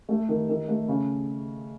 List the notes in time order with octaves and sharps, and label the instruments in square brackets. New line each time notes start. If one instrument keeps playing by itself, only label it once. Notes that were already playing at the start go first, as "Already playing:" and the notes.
[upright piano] A3
D#3
D#3
A3
C#3